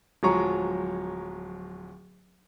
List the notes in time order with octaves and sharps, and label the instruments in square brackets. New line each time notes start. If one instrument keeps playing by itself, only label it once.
[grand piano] D1 F3 F#3 G#3 A#5 C#6